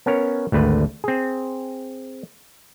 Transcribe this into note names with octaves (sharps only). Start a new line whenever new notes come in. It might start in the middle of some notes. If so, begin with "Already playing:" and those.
B3 C#4 A#4 C#5
G#1 D2 A3 B4
C4 G#4